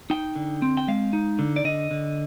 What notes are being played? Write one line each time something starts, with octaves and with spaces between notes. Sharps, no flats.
D#4 G5
D3
C4
G5
G#3 F5
D#4
D3
D5
D3 D#5
D3